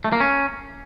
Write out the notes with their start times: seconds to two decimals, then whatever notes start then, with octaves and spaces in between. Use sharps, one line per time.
0.04 A3
0.12 A#3
0.20 C#4